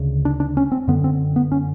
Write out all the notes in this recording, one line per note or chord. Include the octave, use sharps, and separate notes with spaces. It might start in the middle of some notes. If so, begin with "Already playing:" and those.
Already playing: D2 C#3
D4
D4
C#4
C4
F#2 D3 B3
C4
B3
C#4